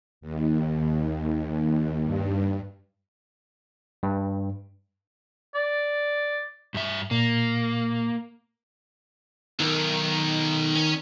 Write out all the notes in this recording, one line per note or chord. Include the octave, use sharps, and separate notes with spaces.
D#2
G2
G2
D5
G2 E5
A#2 A#3
B1 D#3 A#4
C#4 C#5